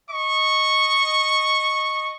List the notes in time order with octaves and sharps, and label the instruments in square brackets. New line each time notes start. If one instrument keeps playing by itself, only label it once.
[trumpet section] D#5 C#6